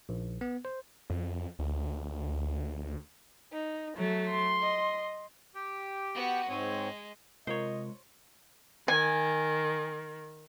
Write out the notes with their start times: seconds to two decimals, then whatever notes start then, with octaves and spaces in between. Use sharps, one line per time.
0.09 A#1
0.41 B3
0.65 C5
1.10 F2
1.59 D2
3.53 D#4
3.95 F#3 A3
4.31 C6
4.62 D#5
5.55 G4 G5
6.14 B3 F#4
6.49 G#2 G#3 C4 C#5
7.47 C3 G#3 F4 A#4 C5 C#5 D#5
8.88 D#3 G#5